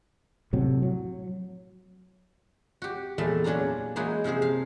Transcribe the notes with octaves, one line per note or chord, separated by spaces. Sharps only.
A2 C3 F#3
F#3
F#4 G4
E2 A#2 A3 A5
F#3 C#4 D4 F4 A#5
E3 G#3 A#3 D#4 F4 F#4
C3 F3 F4 G#4 C5
F5